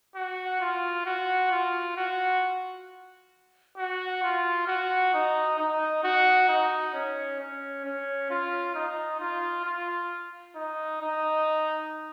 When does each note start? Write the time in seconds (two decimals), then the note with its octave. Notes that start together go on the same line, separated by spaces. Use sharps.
0.15 F#4
0.61 F4
1.06 F#4
1.51 F4
1.97 F#4
3.78 F#4
4.23 F4
4.67 F#4
5.14 D#4
5.59 D#4
6.04 F#4
6.49 D#4
6.94 C#4
7.40 C#4
7.85 C#4
8.30 F4
8.75 D#4
9.20 F4
9.65 F4
10.55 D#4
11.01 D#4